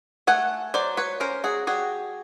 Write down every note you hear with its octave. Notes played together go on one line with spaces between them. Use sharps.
A3 F#5 G#5
F#3 C5 D5
B4 C#5
C#4 A#4 C5
F#4 G#4
G3 F#4 G#4